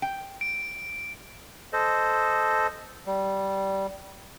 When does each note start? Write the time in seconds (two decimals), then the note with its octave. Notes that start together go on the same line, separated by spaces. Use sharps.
0.02 G5
0.41 D7
1.73 A4 C5 D#5
3.07 G3